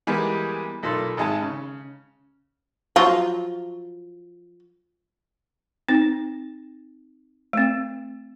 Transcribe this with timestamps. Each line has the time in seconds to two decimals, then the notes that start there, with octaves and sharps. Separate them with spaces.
0.07 E3 G3 G#3 A#3 B3
0.83 B1 A#2 A4 C6
1.17 G#1 G#3 A5
1.42 C#3
2.96 F3 F#3 F4
5.89 C4 D#4
7.53 A3 C4